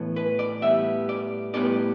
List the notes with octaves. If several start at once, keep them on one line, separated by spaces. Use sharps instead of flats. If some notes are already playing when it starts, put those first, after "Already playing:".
Already playing: A2 E3 B3
B4
D5
A2 G3 B3 E5
D5
A2 G3 B3 D5